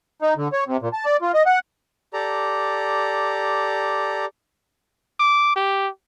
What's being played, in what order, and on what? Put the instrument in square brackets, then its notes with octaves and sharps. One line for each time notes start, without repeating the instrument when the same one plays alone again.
[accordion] D#4
D3
C#5
C3
A#2
A5
D5
F4
D#5
F#5
[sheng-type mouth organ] G4 A4 D5 A#5
[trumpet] D6
G4